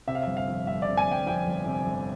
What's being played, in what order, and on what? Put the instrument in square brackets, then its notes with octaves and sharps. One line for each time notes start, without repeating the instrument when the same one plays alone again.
[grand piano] C3 E5
F5
G1 E5
F5
F2
G1 E5
D5
C3
G#5
G1 G5
F2 G5
G1
C3
G1